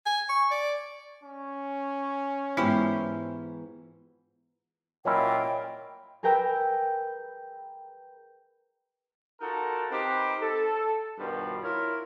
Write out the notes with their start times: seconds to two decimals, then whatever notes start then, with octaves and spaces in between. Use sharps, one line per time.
0.06 G#5
0.29 C#6
0.51 D5
1.23 C#4
2.57 G#2 E3 G#3 B3 E4 F4 G4 C5
5.05 A#2 F#3 C#4 E4 C#5 D#5 G5 B5
6.23 G#4 A#4 B4 G5 A#5 E6
9.41 D#4 F4 F#4 A4 A#4
9.90 C4 D#4 G4 A#4 B4
10.41 A4
11.19 G2 B2 D#3 F3 G3
11.63 E4 F4 A#4 C#5